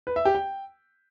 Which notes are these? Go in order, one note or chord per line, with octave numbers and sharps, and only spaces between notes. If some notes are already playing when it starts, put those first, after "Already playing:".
B4
E5
G4
G5